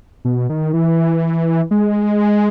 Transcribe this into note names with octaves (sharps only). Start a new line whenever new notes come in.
B2
D#3
E3
G#3